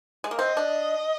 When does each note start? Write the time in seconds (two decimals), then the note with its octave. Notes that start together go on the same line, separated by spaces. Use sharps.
0.24 G#3
0.31 A#3
0.38 C4 D#5
0.57 D4